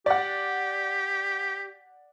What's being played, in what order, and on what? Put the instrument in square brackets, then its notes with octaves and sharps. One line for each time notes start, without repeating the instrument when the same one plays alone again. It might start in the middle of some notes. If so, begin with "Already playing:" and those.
[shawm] G4 [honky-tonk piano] D5 F#5